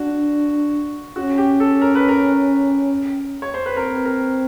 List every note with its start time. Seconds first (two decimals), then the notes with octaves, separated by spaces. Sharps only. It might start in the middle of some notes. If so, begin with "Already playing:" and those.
Already playing: D4 F#4
1.16 C#4 F#4
1.38 G4
1.60 A4
1.82 A#4
1.95 B4
2.09 A#4
3.42 C#5
3.54 C5
3.66 B4
3.77 C4 A#4
3.95 B4
4.05 A#4